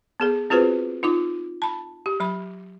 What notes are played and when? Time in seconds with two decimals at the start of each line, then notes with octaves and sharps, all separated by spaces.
0.20 B3 G#4 A4
0.50 C4 F4 F#4 G#4 B4 C5
1.03 D#4 F4 D6
1.62 A5 B5
2.06 G4
2.20 F#3 B5